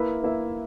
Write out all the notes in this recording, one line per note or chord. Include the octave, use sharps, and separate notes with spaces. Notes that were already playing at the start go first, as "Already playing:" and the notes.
Already playing: A#3 E4 B4 E5
A#3 E4 B4 E5